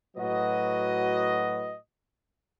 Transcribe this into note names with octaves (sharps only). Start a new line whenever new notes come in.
A2 F#3 F#4 B4 D#5